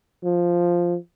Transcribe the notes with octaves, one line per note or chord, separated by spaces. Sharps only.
F3